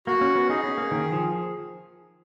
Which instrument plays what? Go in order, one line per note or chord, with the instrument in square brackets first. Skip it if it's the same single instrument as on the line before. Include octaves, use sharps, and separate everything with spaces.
[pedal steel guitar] A#3 [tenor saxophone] F#4
[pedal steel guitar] C#4
B3
[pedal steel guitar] D#4 [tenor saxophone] G#4
[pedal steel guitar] C#4
A#3
D#3
F3